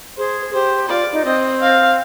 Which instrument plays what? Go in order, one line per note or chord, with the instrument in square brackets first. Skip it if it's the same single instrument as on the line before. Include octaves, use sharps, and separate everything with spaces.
[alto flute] G#4 [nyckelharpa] C5
[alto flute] G4 [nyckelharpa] C5
[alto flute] F4 [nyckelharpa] D5
[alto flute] D#4
[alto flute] C4 [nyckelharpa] D#5
[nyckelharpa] F5